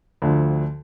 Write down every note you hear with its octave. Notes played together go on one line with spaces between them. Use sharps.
D2 D3 F3